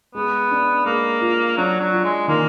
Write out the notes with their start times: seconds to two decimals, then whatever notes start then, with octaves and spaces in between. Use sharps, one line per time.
0.15 G#3 B3
0.51 D4
0.86 G#3 A#3
1.21 F4
1.57 F#3 D4
1.80 F#3
1.92 F4
2.04 G#3
2.28 D#3 A#3